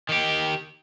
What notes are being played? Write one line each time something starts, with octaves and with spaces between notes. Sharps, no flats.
D#3 G4